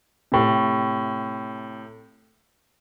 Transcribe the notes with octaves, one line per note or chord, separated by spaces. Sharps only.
A2 C3